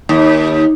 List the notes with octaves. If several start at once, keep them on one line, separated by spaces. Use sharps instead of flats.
D#2